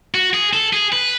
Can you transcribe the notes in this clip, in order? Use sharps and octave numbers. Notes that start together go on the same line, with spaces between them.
F#4
G#4
A4
G#4
B4